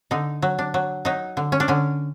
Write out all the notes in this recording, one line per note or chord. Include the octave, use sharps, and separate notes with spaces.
D3 D#4
F#3
D4
F#3
F#3 D#4
D3
C#4
D4
D3 C#4